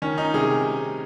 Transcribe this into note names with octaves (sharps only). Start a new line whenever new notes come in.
D#3 C#4
D#4
C3 G#4